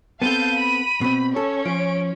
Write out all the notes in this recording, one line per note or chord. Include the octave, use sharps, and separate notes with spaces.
B3 C4 A4 F5 A5 G6 D#7
B5
B2 C4
C#4 A4
F3 D7